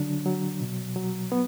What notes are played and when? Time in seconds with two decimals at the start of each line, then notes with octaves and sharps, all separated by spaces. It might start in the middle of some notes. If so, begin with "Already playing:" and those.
Already playing: D3 F#3 D4
0.26 F#3
0.61 B2
0.96 F#3
1.32 B3